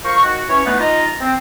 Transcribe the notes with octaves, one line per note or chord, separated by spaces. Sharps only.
F4 A#4 C5 C#6
D#3 F#4
E3 C#4 E4 C#5
E3 A3 B3 D4 D#4 B4
D#4 F4 D#5 A#5
C4